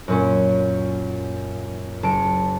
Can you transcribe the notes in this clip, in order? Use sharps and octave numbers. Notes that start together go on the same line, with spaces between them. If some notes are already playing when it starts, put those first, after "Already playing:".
F#2 A#2 C#4
F#1 A5 C#7 D7